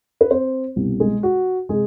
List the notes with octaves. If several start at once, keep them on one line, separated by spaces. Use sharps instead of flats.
B4
C4 C5
C2 B2 G3
G#3 G#4
F#4
C3 G#3 G#4